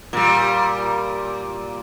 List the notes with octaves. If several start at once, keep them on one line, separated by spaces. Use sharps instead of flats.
A#2 G3